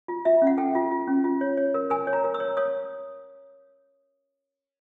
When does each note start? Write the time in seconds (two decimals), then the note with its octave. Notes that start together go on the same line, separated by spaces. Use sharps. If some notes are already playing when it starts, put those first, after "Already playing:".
0.08 F4
0.25 F4 E5
0.42 C#4
0.47 F#5
0.58 A4 G5
0.75 F4
0.91 F4
1.08 C#4
1.24 F4
1.41 C#5
1.57 C#5
1.74 A#4
1.90 A#4 G#5
2.07 C#5
2.13 A#5
2.24 A#4
2.34 E6
2.40 C#5
2.57 C#5 D#6